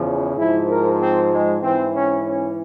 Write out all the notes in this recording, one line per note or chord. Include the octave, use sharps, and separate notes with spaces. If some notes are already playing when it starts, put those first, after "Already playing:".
Already playing: E2 C#3 F3
G#2 F3 E4
A#4
C4
G#3
G#2 E3 C4
C#4
C#4